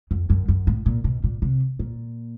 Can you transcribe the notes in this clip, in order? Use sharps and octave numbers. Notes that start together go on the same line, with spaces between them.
F2
F#2
F#2
A2
A#2
B2
A#2
C3
A#2